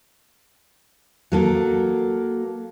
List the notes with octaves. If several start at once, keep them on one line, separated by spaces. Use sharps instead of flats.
F#3 A#3 A4